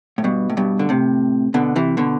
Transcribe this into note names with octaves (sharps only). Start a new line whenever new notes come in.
A2
G2 B2
A2
G2 B2
D3
A2 C3
B2 D3
C3 E3
B2 D3